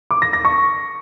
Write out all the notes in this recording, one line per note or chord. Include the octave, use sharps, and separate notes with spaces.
D6
A#6
A#6
C#6